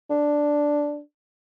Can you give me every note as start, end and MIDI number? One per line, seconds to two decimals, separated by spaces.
0.10 1.00 62